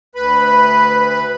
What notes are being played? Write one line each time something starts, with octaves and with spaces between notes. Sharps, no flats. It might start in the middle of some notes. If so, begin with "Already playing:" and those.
D2 B4 B5